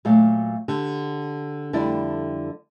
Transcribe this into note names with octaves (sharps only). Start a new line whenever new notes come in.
A#2 F#3 A3 F5
D3 G4
F2 D3 G3 E4 D5